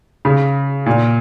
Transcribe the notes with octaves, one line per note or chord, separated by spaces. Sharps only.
C#3
A#2